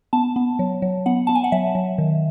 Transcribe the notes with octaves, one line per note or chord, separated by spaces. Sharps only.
B3 A5
B3
F#3
F#3
B3 F#5
B3 A5
G#5
F#5
F#3 E5
F#3
D#3